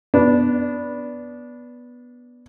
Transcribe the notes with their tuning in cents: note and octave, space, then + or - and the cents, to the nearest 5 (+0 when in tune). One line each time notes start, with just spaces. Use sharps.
B3 -10 D4 -10